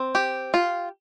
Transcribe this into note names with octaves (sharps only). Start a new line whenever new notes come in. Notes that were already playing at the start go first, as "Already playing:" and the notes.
Already playing: C4
G4
F4